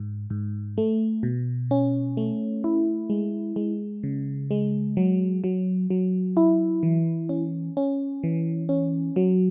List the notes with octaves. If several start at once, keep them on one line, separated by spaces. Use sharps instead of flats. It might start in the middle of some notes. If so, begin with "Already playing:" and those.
Already playing: G#2
G#2
A3
B2
C#4
A3
E4
G#3
G#3
C#3
G#3
F#3
F#3
F#3
E4
E3
C#4
C#4
E3
C#4
F#3